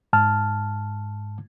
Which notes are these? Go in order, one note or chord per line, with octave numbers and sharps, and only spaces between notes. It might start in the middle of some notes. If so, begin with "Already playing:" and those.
G#2 A5 F6